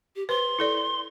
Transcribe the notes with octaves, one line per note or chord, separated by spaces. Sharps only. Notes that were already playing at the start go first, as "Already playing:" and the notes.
G4
B4 C5 C6
E4 A4 D5